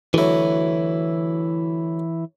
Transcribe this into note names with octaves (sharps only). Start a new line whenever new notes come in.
D2 E3 F#3 E4